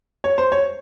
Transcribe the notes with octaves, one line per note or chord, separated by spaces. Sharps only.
C#5
C5
C#5